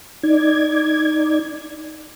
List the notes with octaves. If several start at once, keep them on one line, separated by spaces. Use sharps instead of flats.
D#4 D5 G#6